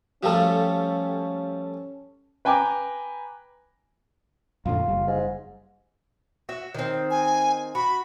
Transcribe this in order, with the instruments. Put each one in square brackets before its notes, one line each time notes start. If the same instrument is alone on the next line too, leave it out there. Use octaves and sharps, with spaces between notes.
[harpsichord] F3 G3 A3 [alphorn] C#4 [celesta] F#4 F5 [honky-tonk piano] G4 A4
[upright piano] B4 G5 G#5 A#5 D6
[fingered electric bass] F#2 A#2 D3 [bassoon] F4
[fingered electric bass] F#1 G3
[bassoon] G#2
[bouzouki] F#4 E5
D#3 C4
[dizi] G#5
[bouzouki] F#4 [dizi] B5